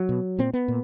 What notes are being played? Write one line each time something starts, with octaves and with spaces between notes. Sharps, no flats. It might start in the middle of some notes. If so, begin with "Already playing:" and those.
Already playing: F#3
B2
A#2 C4
B3
A#2